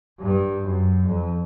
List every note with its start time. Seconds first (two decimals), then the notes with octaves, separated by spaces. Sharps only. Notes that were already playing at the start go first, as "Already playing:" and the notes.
0.20 G2
0.64 F#2
1.07 F2